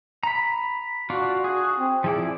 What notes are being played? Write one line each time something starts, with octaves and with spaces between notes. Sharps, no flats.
A#5 B5
D4 F4 F#4 D5
G#4
C4
F3 E4 G#4 D5